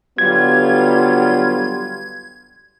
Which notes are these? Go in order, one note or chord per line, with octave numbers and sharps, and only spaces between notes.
D3 F#3 G3 B3 F4 G#6